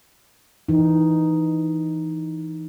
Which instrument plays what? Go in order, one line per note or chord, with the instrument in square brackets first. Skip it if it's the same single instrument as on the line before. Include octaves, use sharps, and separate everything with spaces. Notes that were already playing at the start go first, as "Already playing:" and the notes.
[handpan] E3 D#4